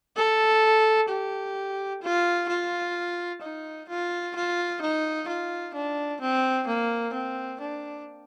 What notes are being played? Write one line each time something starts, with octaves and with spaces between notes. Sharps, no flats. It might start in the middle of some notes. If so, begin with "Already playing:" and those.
A4
G4
F4
F4
D#4
F4
F4
D#4
F4
D4
C4
A#3
C4
D4